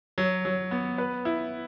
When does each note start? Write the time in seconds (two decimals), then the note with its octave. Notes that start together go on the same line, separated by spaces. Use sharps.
0.18 F#3
0.45 F#3
0.71 B3
0.98 B4
1.25 E4